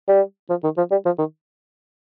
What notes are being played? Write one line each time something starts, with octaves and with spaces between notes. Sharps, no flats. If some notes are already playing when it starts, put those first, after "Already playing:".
G3
F3
D#3
F3
G3
F3
D#3